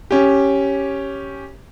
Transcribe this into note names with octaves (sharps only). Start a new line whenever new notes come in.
C#4 G4